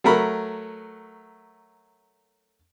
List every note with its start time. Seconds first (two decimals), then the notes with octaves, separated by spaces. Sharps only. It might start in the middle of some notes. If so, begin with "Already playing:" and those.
0.04 F#3 A3 A#4 B5